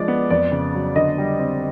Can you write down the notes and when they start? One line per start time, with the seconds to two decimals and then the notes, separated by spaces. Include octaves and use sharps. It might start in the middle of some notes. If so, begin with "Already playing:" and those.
Already playing: F3 G#3 D4 D5
0.08 B3
0.30 F2 D5
0.52 C#3
0.75 F#3
0.96 D3 D#5
1.18 G3
1.39 C4